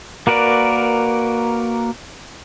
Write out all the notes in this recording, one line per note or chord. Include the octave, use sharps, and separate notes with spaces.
A#3 F#4 A#4 B4 D5